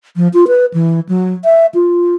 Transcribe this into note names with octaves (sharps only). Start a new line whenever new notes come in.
F3
F4
B4
E3
F#3
E5
F4